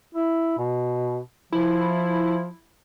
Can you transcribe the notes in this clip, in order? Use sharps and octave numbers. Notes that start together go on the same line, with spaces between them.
E4
B2
F3 E4